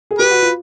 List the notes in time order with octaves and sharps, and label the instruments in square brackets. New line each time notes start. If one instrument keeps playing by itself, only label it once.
[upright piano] G#4
[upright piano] G4 [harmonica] B4
[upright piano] F#4
F4